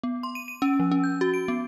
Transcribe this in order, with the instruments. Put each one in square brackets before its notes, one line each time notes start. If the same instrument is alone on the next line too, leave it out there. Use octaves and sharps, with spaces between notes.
[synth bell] B3
C6
D#7
D#7
C#4
F3
C#4
G6
F#4
D7
B3